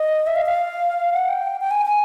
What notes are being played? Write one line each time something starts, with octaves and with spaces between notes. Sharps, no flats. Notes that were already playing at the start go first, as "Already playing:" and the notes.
Already playing: D#5
E5
F5
F5
F#5
G5
G5
G#5
G#5